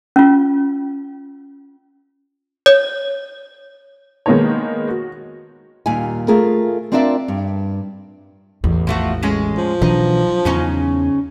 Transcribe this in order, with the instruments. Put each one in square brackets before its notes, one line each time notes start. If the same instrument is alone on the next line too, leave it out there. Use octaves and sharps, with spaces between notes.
[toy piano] C#4 F4
[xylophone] C#5
[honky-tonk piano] D#3 G#3 A#3 B3 D#4 C#5
F#4
[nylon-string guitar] D#2 A#2 G3 F5 G#5
A3 F4 G#4 A#4
C4 D4 F4 A#4 D5 E5
G2
[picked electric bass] A1 [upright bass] E2
[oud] F3 A3 F#4
G#3 C#4
[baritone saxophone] F3
[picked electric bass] B2 E3 D4 [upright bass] F#3 [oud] D#4
[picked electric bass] E2 [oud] C#3 C#4 D#4